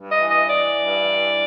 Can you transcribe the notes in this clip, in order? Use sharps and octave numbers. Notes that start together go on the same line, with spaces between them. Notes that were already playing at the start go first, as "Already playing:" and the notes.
Already playing: G2
D#5
E3
D#5
E3 D5
G2
E3